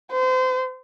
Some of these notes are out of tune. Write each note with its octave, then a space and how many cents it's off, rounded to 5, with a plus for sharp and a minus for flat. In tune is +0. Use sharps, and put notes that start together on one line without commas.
C5 -30